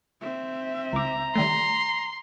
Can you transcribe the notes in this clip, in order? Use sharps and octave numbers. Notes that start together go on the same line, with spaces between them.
C4 E5
C#2 A#5 D6
D#3 G3 A3 C6